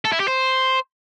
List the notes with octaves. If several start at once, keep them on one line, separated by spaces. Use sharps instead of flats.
A4
E4
G4
C5